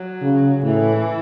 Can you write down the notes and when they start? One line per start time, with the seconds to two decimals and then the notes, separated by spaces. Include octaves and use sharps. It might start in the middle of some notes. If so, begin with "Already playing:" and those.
Already playing: F#3
0.22 C#3
0.63 A2 E3